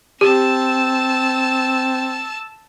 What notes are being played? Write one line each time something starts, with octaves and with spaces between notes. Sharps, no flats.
C4 G4 A5 E6